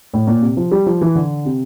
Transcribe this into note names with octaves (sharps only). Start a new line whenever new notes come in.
A2
A#2
C3
F3
G3
F3
E3
D3
C3